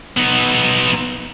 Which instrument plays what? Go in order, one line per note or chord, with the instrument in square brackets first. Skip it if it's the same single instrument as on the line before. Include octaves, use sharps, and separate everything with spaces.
[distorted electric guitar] B3 D#4